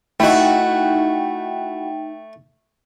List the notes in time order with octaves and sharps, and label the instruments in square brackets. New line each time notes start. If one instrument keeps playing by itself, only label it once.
[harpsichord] A3 [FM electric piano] D#4 G5 [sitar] E4 F#4